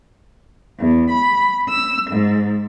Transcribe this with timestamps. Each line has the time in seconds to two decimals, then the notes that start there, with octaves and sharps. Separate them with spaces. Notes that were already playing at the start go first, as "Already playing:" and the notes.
0.80 E2
1.09 B5
1.70 E6
2.10 G#2